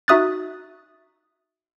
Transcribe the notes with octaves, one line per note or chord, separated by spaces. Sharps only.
D#4 F#4 E5 D#6 F#6 A6